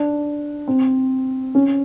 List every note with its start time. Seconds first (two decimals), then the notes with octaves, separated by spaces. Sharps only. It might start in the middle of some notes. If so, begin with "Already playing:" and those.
Already playing: D4
0.68 C4
1.55 C#4